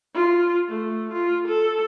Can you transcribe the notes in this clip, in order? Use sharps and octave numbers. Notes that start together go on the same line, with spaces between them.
F4
A3
F4
A4